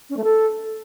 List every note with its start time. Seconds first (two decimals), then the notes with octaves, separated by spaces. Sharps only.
0.09 C#4
0.17 A3
0.24 A4